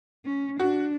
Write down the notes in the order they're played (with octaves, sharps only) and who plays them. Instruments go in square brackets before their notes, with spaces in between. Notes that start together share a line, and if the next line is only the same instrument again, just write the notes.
[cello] C#4
[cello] D4 [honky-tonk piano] F#4